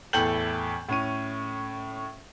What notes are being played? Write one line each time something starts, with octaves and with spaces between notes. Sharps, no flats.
E2 A2 A4 G5 G6 F#7
A2 C#4 D#7